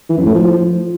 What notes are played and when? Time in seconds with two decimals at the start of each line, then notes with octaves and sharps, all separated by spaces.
0.09 E3
0.17 F#2
0.26 A2
0.34 F3